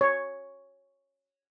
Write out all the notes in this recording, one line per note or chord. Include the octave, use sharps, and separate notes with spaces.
C#5